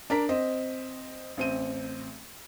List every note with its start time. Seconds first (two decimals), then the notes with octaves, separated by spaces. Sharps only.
0.10 D4 A#4 B6
0.29 C4 D#5
1.37 A1 C4 D#7